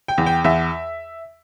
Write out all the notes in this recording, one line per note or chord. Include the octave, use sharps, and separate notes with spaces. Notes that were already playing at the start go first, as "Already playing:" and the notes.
G5
E2
G5
E2 E5